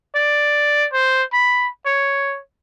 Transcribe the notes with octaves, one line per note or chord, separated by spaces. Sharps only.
D5
C5
B5
C#5